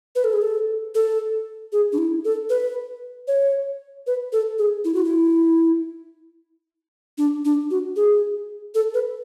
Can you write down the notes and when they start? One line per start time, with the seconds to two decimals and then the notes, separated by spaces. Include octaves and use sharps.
0.16 B4
0.24 A4
0.33 G#4
0.42 A4
0.95 A4
1.73 G#4
1.93 D4
1.98 E4
2.25 A4
2.50 B4
3.28 C#5
4.07 B4
4.33 A4
4.58 G#4
4.85 E4
4.94 F#4
5.05 E4
7.18 D4
7.45 D4
7.71 F#4
7.96 G#4
8.75 A4
8.94 B4